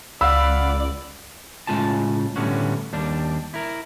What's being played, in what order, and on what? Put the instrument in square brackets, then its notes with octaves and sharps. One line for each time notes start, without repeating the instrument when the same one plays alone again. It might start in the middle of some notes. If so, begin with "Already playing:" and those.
[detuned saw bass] C#2 [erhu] D5 [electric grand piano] F5 F#5 B5 [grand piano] E6
[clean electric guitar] A2 C#3 G#3 F4 G#5 A5
A2 D3 G3 B3 C#4 F#4
D#2 G3 D4
E4 A#4